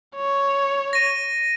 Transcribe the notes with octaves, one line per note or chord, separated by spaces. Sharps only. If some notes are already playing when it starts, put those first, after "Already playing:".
C#5
A#6 D#7